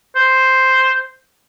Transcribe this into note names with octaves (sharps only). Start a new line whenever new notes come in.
C5